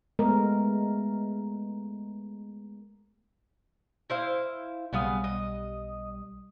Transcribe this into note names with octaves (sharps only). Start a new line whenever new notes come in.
G#3 A3 B3 A#4
E4 C5 F5
B1 C#3 G3 B3 F5 D#6
D#5